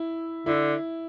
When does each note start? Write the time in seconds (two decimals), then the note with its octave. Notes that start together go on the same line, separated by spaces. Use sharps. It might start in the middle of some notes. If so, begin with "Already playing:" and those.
Already playing: E4
0.46 D3 E4